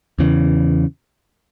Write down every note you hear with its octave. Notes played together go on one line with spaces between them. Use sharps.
E2 C#3 E3